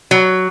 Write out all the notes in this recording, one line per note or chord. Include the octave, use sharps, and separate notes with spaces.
F#3